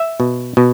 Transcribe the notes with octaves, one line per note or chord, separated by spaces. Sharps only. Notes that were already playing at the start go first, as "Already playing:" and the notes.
Already playing: E5
B2
B2